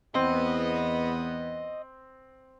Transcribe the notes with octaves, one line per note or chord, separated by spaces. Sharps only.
E2 B3 C4 D#5